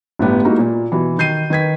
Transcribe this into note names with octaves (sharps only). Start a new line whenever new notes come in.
G1 A2 G3 B3 G4
G#3 A#3 D#4 E4 F#4
A#2
B2 E3
D#3 G6 C7 D#7
D#3 B4 G#6 B6